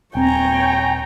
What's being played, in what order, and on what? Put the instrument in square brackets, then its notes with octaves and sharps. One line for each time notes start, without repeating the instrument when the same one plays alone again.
[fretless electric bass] D#1 C4 [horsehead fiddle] C#5 G#5 [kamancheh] G5 [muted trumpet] A#5